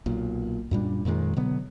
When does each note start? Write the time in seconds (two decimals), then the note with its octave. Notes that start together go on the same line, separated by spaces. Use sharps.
0.06 B1 A#2
0.71 F#2 A#2 G3 D4
1.05 F2 A#2 D#3 G#3
1.36 B2 D3 F#3 B3